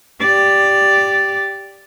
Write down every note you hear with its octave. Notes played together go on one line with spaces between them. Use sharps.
G4 D5